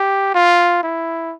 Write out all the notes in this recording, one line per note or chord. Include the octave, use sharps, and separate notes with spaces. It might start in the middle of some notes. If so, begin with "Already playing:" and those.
Already playing: G4
F4
E4